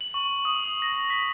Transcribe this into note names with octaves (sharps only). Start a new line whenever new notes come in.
F#7
C#6
D#6
A#6
B6